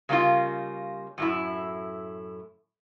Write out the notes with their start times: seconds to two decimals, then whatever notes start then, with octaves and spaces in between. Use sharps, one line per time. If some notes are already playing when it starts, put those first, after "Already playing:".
0.09 C#3 G3 A#3 C#4 D#4 F4
1.18 F#2 A2 E4